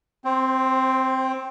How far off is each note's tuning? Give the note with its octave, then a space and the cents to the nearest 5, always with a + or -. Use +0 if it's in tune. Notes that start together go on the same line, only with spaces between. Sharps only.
C4 +0 C5 +25